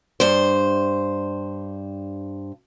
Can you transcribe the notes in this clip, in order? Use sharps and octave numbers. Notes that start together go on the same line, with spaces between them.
G2 C5